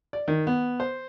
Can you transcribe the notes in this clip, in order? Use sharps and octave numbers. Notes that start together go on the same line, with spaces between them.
D5
D#3
B3
C5